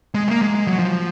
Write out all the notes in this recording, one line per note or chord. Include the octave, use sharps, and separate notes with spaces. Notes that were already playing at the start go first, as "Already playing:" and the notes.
G#3
A#3
G#3
G#3
F#3
F3